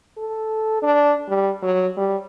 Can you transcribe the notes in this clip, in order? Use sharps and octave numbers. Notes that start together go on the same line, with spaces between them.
A4
D4
G3
F#3
G3